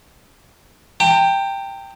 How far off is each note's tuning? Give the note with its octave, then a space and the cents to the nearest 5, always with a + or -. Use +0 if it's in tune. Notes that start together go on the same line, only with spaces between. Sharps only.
G5 +10 A#5 -45